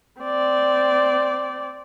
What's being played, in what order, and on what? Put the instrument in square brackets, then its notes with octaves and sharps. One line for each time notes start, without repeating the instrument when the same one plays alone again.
[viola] C4 D5